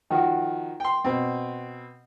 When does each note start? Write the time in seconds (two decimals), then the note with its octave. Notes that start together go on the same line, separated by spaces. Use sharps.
0.10 D#3 F3 F#4
0.80 G5 C6
1.04 B2 C4